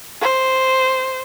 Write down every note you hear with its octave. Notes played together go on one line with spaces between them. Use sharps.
C5